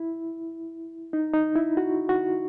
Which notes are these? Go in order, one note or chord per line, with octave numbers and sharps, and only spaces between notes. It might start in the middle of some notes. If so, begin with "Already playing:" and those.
Already playing: E4
D#4
D#4
E4
F#4
F#4